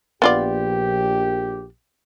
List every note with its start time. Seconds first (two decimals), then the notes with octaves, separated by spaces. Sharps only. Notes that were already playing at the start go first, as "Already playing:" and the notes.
0.22 A#1 B3 F4 G4 D5